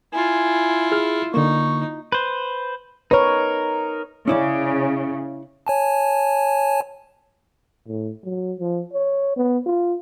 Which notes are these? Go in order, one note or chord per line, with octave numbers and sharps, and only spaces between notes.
E4 F4 G#5
G#4 F6
D3 A#3 D#4 C#6
B4 C5
D#4 A#4 B4 C#5
C#3 C#4 E4 D5
C#5 G#5 A5
A2
F#3
F3
C#5
B3
F4